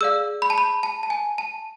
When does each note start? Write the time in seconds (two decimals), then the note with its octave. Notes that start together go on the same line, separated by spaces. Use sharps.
0.01 G#4 D5 F5 E6
0.42 B5
0.50 A5
0.58 B5
0.83 A5
1.03 A5
1.10 G#5
1.38 A5